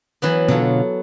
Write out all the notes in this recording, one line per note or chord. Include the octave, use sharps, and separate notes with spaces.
E3 F#3 B3
B2 D3 F#3 F4 A4